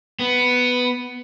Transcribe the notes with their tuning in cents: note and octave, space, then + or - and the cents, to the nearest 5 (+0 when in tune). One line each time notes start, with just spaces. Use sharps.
B3 +5